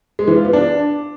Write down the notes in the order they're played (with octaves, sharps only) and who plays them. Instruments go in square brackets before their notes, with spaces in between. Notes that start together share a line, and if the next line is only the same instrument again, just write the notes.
[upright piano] G#3
E3
F4
B3
D4